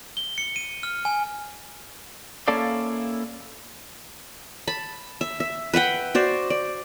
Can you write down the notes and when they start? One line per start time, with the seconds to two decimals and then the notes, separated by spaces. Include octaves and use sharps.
0.17 G7
0.38 C#7
0.56 D#7
0.83 F6
1.05 G#5
2.48 A#3 C#4 E4 A4 D5 F5
4.68 A5 B5
5.21 E5
5.40 E5
5.74 B4 E5 F#5 G5
6.15 F#4 C5 D5
6.50 D5